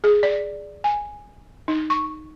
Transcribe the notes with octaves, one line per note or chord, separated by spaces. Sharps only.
G#4
D5
G#5
D#4
C#6